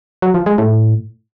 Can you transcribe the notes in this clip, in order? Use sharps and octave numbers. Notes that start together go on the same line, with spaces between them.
F#3
F3
G#3
A2